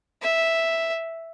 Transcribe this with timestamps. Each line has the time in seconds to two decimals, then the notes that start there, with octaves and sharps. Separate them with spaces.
0.22 E5